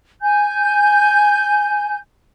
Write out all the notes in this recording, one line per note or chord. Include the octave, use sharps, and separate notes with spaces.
G#5 G6